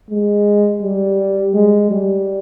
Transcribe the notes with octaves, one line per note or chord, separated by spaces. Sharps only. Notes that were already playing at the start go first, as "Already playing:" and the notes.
G#3
G3
G#3
G3